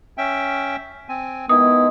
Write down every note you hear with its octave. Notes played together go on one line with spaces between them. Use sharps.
C#4 E5 G5
C4 G#5
D#3 G#3 B3 E4 D#6